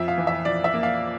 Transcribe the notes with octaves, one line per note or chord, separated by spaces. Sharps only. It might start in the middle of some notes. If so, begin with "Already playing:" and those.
Already playing: F2 E5
F5
E3
E5
F2 D5
E5
A#3
F5